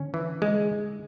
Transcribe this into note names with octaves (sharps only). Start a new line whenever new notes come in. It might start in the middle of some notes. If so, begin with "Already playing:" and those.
Already playing: D3 C#4
E3
G#3